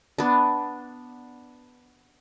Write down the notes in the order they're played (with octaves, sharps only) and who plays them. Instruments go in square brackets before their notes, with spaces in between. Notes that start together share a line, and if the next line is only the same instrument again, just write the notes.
[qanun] B3 D4